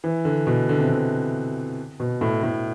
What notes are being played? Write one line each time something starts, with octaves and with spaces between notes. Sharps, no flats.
E3
D3
B2
D3
C3
D3
B2
A2
A2